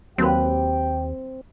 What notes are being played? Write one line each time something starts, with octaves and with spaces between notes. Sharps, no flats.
D#2 F#3 A#3 C4 G4 B4 G5